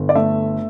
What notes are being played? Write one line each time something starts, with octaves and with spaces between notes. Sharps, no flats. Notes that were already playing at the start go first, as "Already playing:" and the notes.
Already playing: G1
D5
A3 E5